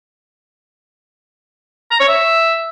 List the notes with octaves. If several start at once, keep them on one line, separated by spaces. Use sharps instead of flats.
A#5
C#5
E5